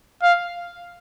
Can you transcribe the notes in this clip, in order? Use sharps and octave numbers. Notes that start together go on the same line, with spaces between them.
F5